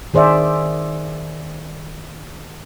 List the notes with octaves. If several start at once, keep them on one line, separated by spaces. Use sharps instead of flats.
D#3 G#4 C5 D5 E5